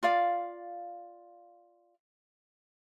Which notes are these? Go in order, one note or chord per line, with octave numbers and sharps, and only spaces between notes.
F4 D5 F5